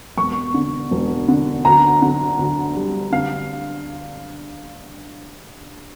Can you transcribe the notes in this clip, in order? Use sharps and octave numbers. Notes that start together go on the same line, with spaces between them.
E1 C#6
D3
E1
D3
D2 A#5
D3
D2
G3
D3 F5